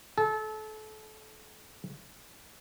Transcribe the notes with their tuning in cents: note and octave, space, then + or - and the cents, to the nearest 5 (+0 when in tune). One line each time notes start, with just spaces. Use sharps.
A4 -30